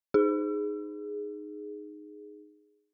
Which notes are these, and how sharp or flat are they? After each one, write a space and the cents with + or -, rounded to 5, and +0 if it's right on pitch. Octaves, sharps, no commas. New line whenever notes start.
D#4 -15 G#4 +0